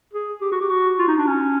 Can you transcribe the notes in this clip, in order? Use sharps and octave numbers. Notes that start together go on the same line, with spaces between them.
G#4
G4
F#4
G4
F#4
F4
D#4
D4
C#4